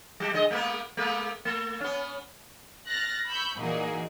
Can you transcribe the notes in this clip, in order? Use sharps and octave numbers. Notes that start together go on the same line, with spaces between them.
G3 G4
D3 G#3 D#5
G#3 A#3 B3
G#3 A#3 B3
A3
B3 C#4
F6 F#6 A6 A#6
B5 C#6 E6 G6
A#2 E3 A#3 D#4 F#4 G#4